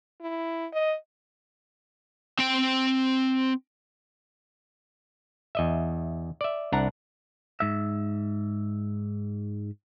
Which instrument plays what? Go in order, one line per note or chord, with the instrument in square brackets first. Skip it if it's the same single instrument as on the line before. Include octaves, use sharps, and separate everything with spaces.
[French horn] E4
D#5
[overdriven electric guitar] C4 G5
[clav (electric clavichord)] E2 D#5 E5
D5 E5
C2 D4 F#5 A#5
[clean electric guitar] G#2 E5